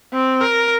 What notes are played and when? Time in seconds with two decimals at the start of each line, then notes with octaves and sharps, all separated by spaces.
0.13 C4
0.41 A#4